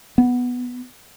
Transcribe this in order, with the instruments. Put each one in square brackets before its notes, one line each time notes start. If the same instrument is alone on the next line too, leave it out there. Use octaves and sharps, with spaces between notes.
[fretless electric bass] B3